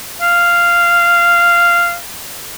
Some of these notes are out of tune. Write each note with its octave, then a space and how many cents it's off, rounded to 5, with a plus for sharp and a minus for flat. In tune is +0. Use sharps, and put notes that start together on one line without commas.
F5 -10